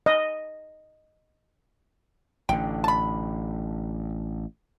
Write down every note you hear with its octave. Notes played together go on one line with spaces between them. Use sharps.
D#5
A1 D3 G5
A5 B5